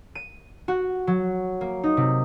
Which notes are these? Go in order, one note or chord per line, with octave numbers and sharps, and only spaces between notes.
D#7
F#4
F#3
A#3
D#4
C3